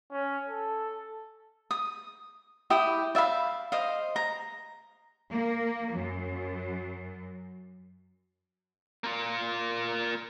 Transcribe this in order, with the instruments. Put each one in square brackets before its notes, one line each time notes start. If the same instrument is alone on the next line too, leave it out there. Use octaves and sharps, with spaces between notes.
[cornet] C#4
A4
[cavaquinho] D#6
E4 G4 G5 D#6
D5 E5 F5 B5
C5 D#5 F5
A#5
[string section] A#3
F#2
[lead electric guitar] A#3 F4